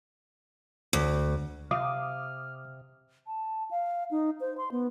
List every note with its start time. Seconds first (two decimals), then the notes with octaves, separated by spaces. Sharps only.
0.93 D2
1.71 C3 F5 D6 D#6 F6
3.27 A5
3.71 F5
4.11 D#4
4.40 C5
4.58 C6
4.72 B3